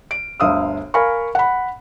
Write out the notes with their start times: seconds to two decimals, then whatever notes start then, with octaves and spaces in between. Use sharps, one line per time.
0.11 D7
0.40 G1 D2 F5 D#6 E6
0.94 A#4 F5 G#5 B5 C#6
1.35 F#5 B5